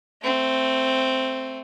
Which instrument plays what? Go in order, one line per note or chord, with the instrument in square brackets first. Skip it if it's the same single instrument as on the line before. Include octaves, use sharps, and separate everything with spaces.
[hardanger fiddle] A3 C4